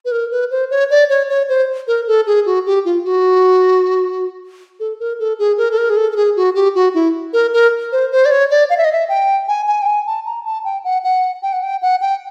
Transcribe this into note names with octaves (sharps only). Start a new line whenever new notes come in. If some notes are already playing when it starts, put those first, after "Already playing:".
B4
A#4
B4
C5
C#5
D5
C#5
C#5
C5
A#4
A4
G#4
F#4
G4
F4
F#4
A4
A#4
A4
G#4
A#4
A4
A#4
G#4
A4
A4
G#4
F#4
G4
F#4
E4
A#4
A#4
C5
C5
D5
C#5
D5
F5
E5
D#5
E5
G5
G#5
G#5
G5
G#5
A5
A#5
A5
G5
F#5
F#5
G5
F#5
G5
F#5
G5